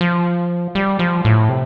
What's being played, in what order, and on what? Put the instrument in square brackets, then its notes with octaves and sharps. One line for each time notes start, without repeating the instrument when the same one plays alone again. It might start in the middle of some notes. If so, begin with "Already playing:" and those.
[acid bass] F3
G3
F3
A2
C3